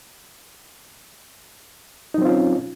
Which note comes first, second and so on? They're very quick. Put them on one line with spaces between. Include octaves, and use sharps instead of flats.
D#4 F#3 C4 F4 C#4